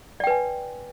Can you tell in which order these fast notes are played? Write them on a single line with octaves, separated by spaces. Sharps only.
D5 G5 B4 G#5